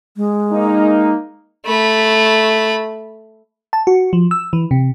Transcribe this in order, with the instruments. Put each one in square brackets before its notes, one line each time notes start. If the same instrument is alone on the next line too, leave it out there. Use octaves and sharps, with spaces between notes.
[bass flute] G#3
[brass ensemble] A#3 D#4
[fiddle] A3 B5
[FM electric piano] A5
F#4
F3
E6
E3
C3